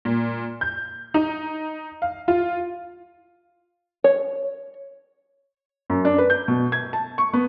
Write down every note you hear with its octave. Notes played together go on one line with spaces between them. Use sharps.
A#2
G6
D#4
F5
F4
C#5
F#2
D4
B4
G6
B2
G#6
A5
C#6
B3